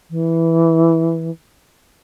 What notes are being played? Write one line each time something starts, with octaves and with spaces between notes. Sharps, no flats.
E3